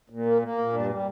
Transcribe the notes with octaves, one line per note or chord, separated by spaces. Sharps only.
A#2
A#3
A#3
A#2
G2 D4
G3